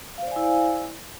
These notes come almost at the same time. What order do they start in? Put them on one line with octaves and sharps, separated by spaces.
F5 C5 D5 G#5 E4